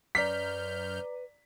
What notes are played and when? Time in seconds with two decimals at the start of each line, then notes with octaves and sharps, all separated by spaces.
0.15 F#2 B4 D5 A#5 D6 F6 G6 B6